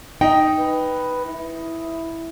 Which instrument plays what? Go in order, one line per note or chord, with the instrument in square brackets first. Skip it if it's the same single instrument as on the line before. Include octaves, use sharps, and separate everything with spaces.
[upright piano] D#4 [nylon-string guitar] G5
[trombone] B4
E4